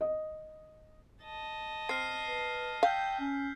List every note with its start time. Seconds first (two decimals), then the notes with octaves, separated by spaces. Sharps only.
0.01 D#5
1.24 D#5 A5
1.89 C4 F6 C7
2.25 B4
2.83 F5 G5 E6 G6 B6
3.20 C#4